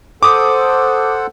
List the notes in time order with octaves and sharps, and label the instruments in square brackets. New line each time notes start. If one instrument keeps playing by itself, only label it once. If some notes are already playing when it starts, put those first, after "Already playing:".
[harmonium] A4 C5 F#5 [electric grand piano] D6 D#6